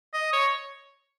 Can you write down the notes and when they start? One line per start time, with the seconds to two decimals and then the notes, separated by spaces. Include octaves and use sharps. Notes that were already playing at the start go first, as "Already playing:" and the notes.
0.13 D#5
0.33 C#5